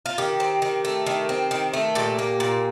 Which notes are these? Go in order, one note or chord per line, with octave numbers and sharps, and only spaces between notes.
F4
D#3 G4
C4
D#3
A3
D#3
C4
D#3
A3
A#2 G4
A#3
A#2